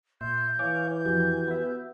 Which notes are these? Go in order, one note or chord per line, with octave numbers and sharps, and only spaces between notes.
A#2 E5 C6 G6
E3 C#5 F5 G#5 D6
F2 F#4 G4 G#5
B3 E5